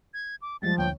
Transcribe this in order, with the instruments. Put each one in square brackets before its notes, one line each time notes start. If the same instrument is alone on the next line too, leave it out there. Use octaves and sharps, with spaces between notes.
[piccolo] G#6
D6
[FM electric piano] D#2 G3 G#3 [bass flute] F3 [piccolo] A6
[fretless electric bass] D2 [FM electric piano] G2 A#2 C#5 [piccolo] G5